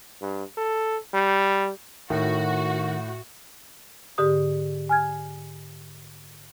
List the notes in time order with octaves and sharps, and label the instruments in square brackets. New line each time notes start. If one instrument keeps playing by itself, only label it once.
[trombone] G2
A4
G3
[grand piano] A2 [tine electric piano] D#3 [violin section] F#4
[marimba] G#2 D3 G4 D#6
G#5 F6 G#6